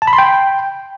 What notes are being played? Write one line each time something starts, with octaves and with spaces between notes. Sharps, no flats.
A5
B5
C6
G5